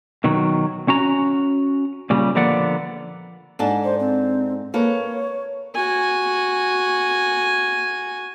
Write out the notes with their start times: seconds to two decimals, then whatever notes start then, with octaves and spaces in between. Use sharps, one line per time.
0.24 B2 D#3 F#3
0.88 C#4 F#4 A#5
2.10 A#2 C#3 G3
2.35 D3 F3 A#3 B3 D5 F#5
3.59 G#2 D4 A4
3.84 C5
3.99 C4
4.74 A#3 A4 B4 C#5
5.75 F#4 G#5